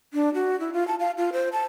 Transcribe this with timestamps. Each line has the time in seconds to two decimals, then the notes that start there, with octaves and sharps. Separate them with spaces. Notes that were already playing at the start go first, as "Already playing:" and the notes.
0.14 D4
0.34 F#4
0.60 E4
0.73 F4
0.88 A5
1.00 F5
1.18 F4
1.33 C5
1.53 A5